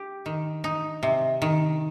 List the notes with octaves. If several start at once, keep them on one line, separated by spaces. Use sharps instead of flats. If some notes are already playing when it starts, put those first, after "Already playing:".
Already playing: G4
D#3
D#4
C3
D#3